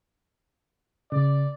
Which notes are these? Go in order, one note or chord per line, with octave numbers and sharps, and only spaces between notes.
C#3 D5